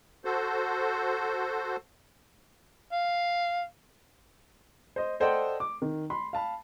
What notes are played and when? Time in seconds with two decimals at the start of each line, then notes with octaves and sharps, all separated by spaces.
0.25 F#4 A4 C5
2.92 F5
4.96 C5 D#5
5.20 A4 C5 D5 D#5 F#5 G5
5.60 D6
5.82 D#3
6.10 B5 C6
6.33 F5 A5 B5